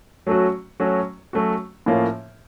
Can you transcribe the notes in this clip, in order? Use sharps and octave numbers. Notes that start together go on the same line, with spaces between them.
F#3 A3 C#4 F#4
F#3 A3 C#4 F#4
F#3 A3 C#4 F#4
A2 F3 A#3 C#4 F4